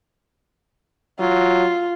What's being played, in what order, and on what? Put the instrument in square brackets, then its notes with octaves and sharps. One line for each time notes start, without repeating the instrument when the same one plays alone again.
[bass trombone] F#3 [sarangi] F4